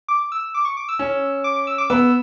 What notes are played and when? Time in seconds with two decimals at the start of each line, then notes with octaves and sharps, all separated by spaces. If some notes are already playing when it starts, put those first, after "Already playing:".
0.08 D6
0.32 E6
0.54 D6
0.65 C#6
0.77 D6
0.89 E6
0.99 C#4
1.44 D6
1.56 D6
1.67 E6
1.78 D6
1.90 B3 E6